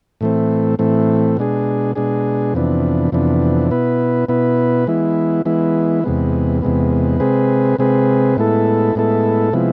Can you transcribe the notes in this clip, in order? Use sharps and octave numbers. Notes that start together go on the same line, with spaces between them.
A2 E3 A3 C4
A2 E3 A3 C4
B2 G#3 D4 G#4
B2 G#3 D4 G#4
F2 C3 E3 B3 D4
F2 C3 E3 B3 D4
B2 B3 E4 B4
B2 B3 E4 B4
E3 G#3 B3 E4
E3 G#3 B3 E4
E2 C3 G#3 B3
E2 C3 G#3 B3
C3 G#3 C4 G#4 B4
C3 G#3 C4 G#4 B4
A2 G#3 B3 E4 A4
A2 G#3 B3 E4 A4
C3 F3 G#3 B3 E4